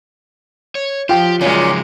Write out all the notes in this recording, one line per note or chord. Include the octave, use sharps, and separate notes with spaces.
C#5
F3 F4 G4 G5
A#2 C#3 F3 F#3 G#3 C#4